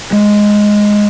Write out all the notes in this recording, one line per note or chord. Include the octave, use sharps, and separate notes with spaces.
G#3